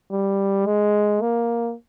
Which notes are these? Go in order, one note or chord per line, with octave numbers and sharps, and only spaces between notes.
G3
G#3
A#3